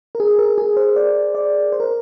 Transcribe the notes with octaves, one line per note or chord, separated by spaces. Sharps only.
A#4
G#4
A#4
G#4
C5
D5
D5
C5
A#4